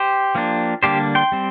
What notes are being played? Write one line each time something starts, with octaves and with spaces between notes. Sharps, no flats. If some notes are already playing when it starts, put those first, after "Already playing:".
Already playing: G4 C5
F3 A#3 D4
D3 G3 A#3 D4 G4 C5
G5 C6
G3 C4